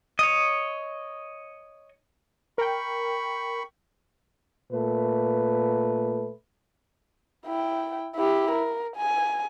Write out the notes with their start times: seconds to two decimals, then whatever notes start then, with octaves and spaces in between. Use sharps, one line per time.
0.19 C#5 D#5
2.58 A#4 G5 B5 C#6
4.72 A#2 A3 B4
7.46 E4 G5
8.16 E4 G4
8.51 A#4
8.96 G#5